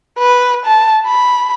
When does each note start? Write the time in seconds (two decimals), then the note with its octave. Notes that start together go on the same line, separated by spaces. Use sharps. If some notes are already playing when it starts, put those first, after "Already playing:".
0.19 B4
0.66 A5
1.06 B5